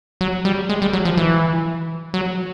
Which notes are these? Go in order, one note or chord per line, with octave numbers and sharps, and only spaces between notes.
F#3
G3
G#3
G3
F#3
F3
E3
F#3